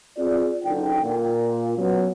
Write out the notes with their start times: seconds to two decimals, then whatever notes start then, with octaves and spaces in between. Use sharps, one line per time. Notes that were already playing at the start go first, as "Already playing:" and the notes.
0.18 C4 F4 G#4 D5
0.65 F#1 D3 D#4 A4 G5
1.04 A#2
1.78 F#3 B3 C#4